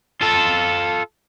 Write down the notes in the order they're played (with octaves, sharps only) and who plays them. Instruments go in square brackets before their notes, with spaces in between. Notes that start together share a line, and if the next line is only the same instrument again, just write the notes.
[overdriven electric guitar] F4 A4